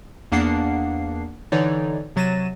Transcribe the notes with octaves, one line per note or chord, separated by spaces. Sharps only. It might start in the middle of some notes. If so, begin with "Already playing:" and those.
E2 A#3 B3 D4 F#5 C7
D3 E3 D#4 C#5 D5
C3 F#3 A6 A#6 D#7 E7